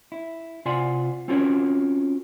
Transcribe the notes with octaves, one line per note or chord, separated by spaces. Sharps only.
E4
C3 F4 D5 F#5 G#5 C6
C4 C#4 F4 F#4 A#4 C#5